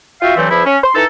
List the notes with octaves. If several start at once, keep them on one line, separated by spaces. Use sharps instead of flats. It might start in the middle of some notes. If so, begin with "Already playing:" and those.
F4 F#4 E5 F5 G5
G2 E3 F#3 A3 C4
E2 F3 E4
C#4
C6
E3 D#4 A4